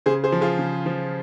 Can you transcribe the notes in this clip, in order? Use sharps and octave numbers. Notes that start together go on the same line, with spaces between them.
C#3 G#4 C5
G#4 C5
F3
F4 G#4
C#3
F3